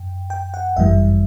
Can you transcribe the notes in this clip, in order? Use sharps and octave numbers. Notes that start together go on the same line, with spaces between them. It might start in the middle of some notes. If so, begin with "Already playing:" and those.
Already playing: F#2 G5
G5
F#5
G1 F#2 E3 G3 E5